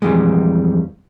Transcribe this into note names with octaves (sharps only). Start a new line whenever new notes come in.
F2 A2 E3 G3 G#3